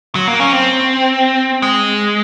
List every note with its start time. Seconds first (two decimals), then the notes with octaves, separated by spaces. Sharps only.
0.15 F#3
0.28 A#3
0.40 C#4
0.52 C4
1.62 G#3